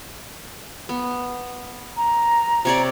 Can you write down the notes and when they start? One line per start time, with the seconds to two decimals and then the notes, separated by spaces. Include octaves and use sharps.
0.89 B3
1.97 A#5
2.65 C3 C#5 D5